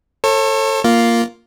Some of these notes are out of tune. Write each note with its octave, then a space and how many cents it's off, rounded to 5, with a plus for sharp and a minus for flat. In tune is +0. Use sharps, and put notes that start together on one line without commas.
A4 +20 C#5 -35
A#3 +0 F4 +0